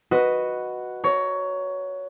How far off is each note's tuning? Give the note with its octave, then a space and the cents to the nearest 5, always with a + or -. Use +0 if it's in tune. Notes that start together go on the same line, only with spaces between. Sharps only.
F#4 +0 B4 +0 D#5 +0
C#5 +15 A#5 +0